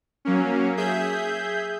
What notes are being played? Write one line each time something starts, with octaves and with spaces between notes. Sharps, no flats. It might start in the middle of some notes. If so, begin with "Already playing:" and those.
F#3 A#3 C#4
G#4 E5 G6